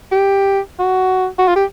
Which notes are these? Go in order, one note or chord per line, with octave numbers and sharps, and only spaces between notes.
G4
F#4
F#4
F4
G4